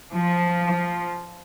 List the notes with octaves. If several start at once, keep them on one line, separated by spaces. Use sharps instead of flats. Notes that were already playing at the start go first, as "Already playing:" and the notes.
F3